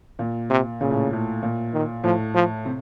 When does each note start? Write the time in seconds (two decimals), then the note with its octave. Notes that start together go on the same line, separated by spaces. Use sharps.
0.19 A#2
0.50 C3
0.81 A#2 C#3
0.91 A2
1.13 A2
1.43 A#2
1.74 D#3
2.04 A2 F3
2.35 F3
2.65 C3